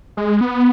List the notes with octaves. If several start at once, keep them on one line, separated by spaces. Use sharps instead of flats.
G#3
B3